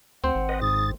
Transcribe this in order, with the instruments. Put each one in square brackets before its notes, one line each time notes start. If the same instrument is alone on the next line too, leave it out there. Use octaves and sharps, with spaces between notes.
[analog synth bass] D2 [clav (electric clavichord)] C4 C5 [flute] F#5
[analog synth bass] G#1
[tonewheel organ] B4 D#5
[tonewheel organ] G#2 A6 [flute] D#6